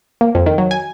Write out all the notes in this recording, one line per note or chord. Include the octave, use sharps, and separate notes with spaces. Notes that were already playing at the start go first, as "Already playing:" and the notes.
A#3
F2
D#3
F#3
G#5